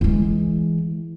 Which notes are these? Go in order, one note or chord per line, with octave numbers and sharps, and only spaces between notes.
E3 G#3